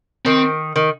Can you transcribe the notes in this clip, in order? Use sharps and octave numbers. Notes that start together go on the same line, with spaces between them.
D#3 C4
D#3